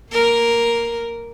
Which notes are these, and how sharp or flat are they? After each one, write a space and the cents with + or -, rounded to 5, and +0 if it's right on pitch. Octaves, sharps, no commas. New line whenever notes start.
A#3 +0 A#4 +0